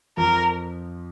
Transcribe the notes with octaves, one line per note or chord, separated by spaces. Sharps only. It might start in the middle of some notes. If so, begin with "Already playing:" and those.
F2 F3 A#4